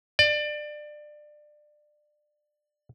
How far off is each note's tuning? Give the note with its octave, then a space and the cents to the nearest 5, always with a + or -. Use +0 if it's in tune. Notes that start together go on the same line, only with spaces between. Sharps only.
D5 +25